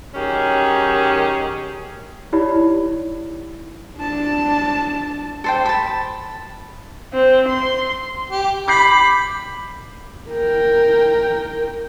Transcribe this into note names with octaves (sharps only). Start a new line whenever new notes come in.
D#3 F#3 C#4 G4 G#4
D#4 E4 G4 C#5 D5 B5
D4 A5
A4 C5 G5
A5 B5
C4
C6
G4
B5 D6 G6 C7
A#4 G5